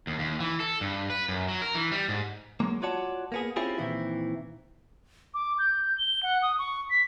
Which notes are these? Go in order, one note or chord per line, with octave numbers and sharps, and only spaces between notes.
D#2
D#2
E3
A4
G2
B4
F#2
F#3
A#4
E3
G3
G#2
F#3 G#3 A#3
F4 F#4 C#5 D5 F#5 A5
A#3 B3 G#4
C4 C#4 E4 F4 G4 G#4
A#2 D#3 E3 C4 E4
D6
G6
G7
F#5
D#6
C#6
B6